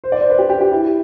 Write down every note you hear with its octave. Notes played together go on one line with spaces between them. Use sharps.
C5
D5
C5
B4
G4
G4
G4
E4